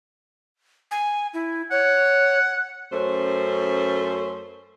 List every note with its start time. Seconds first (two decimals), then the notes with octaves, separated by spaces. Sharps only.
0.91 G#5
1.34 E4
1.71 C#5 F#5
2.92 F#2 A3 C#4 C5